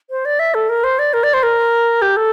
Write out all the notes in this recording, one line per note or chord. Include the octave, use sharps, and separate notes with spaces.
C5
D5
E5
A4
A#4
C5
D5
A#4
D5
C5
A#4
G4
A4